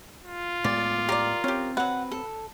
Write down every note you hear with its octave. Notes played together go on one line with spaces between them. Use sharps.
F4
A2 G#3 B3 D5
G4 A#4 C#5 D5
C4 C#4 G4
F#3 B4 F#5
A4